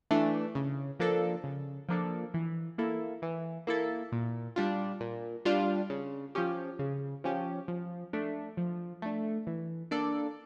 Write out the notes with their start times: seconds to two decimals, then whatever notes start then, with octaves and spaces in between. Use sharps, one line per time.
0.11 E3 A3 D4
0.55 C#3
1.00 F3 A#3 D4 A4
1.44 C#3
1.89 F3 A#3 D4 A4
2.34 E3
2.78 A#3 E4 A4
3.22 E3
3.67 A#3 E4 A4
4.12 A#2
4.56 G3 D4 F4
5.00 A#2
5.45 G3 D4 F4
5.90 C#3
6.35 F3 C#4 G4
6.79 C#3
7.24 F3 C#4 G4
7.68 F3
8.13 A3 D4
8.57 F3
9.02 A3 D4
9.47 E3
9.91 A#3 D4 A4 D5